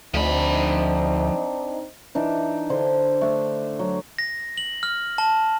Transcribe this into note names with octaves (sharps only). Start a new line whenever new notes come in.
D2 F3 C4 D4 D#4 B5
E3 D4 D#4
D3 C5 C6
A3 D4
F#3
A#6
F#7
F6
A5